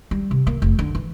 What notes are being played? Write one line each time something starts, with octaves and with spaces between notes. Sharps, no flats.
G3
C3
A#3
F1
D3
E3